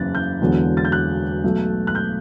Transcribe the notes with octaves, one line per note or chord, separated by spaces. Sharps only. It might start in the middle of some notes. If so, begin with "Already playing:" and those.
Already playing: F#1 E2 C#3 E3 F#6 A6
G6
E1 E2 D3 F#3
A6
G6
F#6
B1 B2 A3
F#6
G6